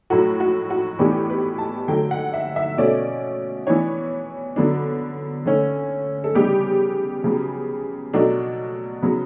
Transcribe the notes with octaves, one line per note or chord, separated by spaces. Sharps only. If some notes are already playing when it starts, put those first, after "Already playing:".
A2 F#3 A3 F#4
F#4
F#4
A2 E3 B3 D4 G4
B4
A5
D3 F#3 A3 G5
F#5
E5
E5
B2 A3 C#4 D5
E3 B3 D4 C#5
D3 F#3 B3 D4
D3 A3 C#4
A4
C#3 G3 B3 D4 G4
C#3 F#3 B3
B2 F#3 A3 D4
C#3 F#3 B3